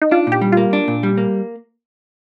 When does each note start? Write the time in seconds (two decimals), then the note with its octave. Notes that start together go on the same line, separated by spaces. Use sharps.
0.02 D#4
0.11 D4 F4
0.27 A#2 G4
0.42 G3
0.52 A#3 F4
0.73 D4
0.88 A#2
1.03 G3
1.18 A#3